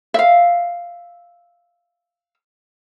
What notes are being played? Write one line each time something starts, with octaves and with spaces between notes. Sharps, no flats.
E5 F5